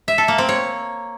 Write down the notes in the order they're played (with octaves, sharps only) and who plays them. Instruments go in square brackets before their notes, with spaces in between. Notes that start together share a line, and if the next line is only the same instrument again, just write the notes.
[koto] E5
A4
A#3
C4
C#5